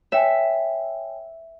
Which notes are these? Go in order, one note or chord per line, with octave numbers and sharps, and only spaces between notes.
C#5 E5 G5 G#5